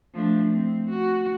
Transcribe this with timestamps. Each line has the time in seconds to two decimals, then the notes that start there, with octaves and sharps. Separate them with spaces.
0.14 F3 A3 D4
0.52 C4
0.90 F#4